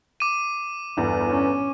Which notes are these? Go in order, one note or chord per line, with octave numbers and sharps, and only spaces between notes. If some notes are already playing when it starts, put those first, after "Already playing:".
D6 D#7
G1 E2 B3
C#4